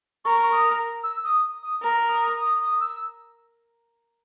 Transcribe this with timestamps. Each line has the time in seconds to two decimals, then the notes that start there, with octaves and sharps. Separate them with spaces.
0.25 A#4 C#6
0.52 D#6
1.03 E6
1.24 D#6
1.63 D#6
1.82 A#4
2.09 D#6
2.36 D#6
2.60 D#6
2.81 E6